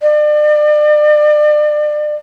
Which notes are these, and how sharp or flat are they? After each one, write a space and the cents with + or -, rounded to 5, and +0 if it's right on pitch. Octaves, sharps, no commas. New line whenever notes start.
D5 +35